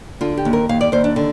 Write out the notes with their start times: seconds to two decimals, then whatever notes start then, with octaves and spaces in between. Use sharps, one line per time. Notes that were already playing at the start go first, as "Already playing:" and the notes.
0.21 D3 F4
0.37 G4
0.45 D#2
0.53 A#4
0.69 D#2 F5
0.81 D5
0.92 D#2 C5
1.04 D4
1.16 D3